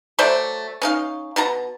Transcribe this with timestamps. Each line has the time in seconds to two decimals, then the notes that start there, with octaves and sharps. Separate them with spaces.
0.19 F#3 A3 C5 D5
0.82 C#4 D#4 F5
1.36 B2 A5 A#5